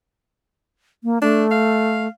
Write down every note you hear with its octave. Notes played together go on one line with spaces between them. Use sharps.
A#3
A3 D4
F5